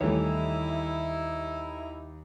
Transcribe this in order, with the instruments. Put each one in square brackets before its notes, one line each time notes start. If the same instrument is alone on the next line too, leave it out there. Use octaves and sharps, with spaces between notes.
[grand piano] D#2 G3 [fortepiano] E3 A3 C#5 [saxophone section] D#4 E4